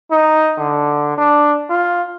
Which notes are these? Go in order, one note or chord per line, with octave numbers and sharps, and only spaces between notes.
D#4
D3
D4
F4